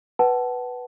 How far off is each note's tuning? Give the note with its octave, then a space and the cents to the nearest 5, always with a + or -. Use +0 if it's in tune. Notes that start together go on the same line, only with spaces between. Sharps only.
B4 +0 F#5 +30 A5 -20